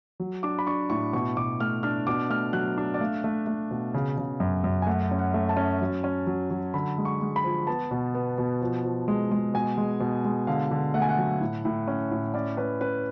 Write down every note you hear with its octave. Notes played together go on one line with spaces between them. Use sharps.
F#3
D4 D6
B5
D4 C#6
A2 C#6
B2 C#6
B2 D6
A3 F6
D4 F6
B2 D6
A3 F6
F#3 F#6
D4
D5
A3 F5
A3
A3
B2
C#3
C#3
F#2
F#2
G#5
A3 F#5
C#4
F#5
A3
A5
C#4
F#3
C#4
F#3
F#3
D3 B5
G#3
C#6
G#3
B5
F3
B3 A5
B2
B3
B2
F3
F3
G#3
G#3
B2 G#5
G#3
B2
G#3
D3 F5
D3
A3 F#5
G#5
F#5
F#3
A2
A2
C#4
A2
C#4 D5
C#4 B4
C#4 B4